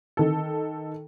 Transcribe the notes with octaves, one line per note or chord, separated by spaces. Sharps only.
D#3 A4